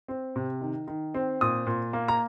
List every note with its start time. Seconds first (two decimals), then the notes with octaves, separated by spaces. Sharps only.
0.08 C4
0.36 C3
0.61 D#3
0.87 D#3
1.14 C4
1.41 A#2 D#6
1.66 A#2
1.93 A#3
2.08 A#5